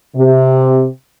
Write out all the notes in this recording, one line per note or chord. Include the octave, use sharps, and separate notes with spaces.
C3